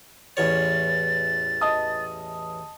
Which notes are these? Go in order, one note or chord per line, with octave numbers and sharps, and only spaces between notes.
A1 E2 C#5 A6
D#5 A5 D#6